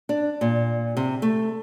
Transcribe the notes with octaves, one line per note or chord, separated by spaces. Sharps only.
D4
A#2
C3
A3